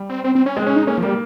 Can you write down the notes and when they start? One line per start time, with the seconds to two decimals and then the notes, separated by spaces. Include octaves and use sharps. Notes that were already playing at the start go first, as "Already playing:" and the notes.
Already playing: G3
0.09 C4
0.24 C4
0.35 C4
0.46 C#4
0.56 G#3 C4
0.66 C#4
0.76 D#4
0.87 A#3 C#4
0.98 F3
1.03 G3 A#3